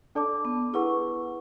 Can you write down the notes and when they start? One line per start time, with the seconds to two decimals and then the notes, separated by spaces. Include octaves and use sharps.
0.15 D4 A4 D5 A5 D6
0.45 B3
0.73 E4 G#4 B4 F#5 C#6